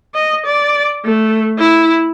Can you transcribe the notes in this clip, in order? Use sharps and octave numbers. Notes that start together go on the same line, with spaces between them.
D#5
D5
A3
E4